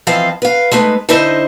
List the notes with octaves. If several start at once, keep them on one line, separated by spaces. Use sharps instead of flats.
E3 F3 C4 E4 D#5 F5
B4 F5
G#3 A3 D#4 B4
D3 D#4 E4 C5 D#5